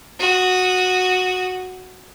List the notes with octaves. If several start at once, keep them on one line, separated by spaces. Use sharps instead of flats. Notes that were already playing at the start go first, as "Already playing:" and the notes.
F#4 D#6